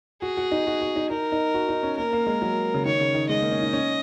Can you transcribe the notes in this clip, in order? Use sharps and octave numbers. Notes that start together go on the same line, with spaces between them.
F#4 G#4
F#4
D#4
F#4
F#4
D#4
D#4 A#4
D#4
F#4
D#4
C#4
A#3 A#4
A#3
G#3
F#3
C#3
D#3 C#5
C#3
D#3
G#3 D#5
A#3
C#4
D#4
C#4